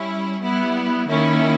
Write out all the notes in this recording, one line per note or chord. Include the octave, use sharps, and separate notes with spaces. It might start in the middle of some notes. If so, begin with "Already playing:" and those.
Already playing: G3 C#4 E4
G3 B3 E4
D#3 A#3 C#4 E4